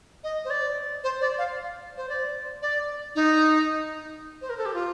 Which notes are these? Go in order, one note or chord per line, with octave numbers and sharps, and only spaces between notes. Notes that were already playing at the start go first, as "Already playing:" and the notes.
D#5
C5
D5
C5
D5
F5
C5
D5
D5
D#4
C5
A#4
A4
G4
F4